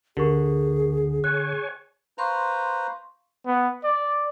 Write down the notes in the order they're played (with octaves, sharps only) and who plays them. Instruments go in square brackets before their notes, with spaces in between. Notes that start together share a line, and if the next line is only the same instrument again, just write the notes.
[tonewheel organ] D2 [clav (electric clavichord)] D3 [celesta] G4 A#4 C#6 [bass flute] G#4
[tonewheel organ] C#5 G#5 [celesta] F#6
[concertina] B4 C5 A#5 [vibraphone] F5 C6 C#6
[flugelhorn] B3
D5